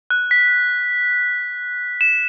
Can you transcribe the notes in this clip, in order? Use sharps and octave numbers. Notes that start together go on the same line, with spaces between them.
F#6
B6
E7